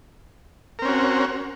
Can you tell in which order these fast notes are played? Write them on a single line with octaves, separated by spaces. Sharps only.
A#4 C4 C#4 F#4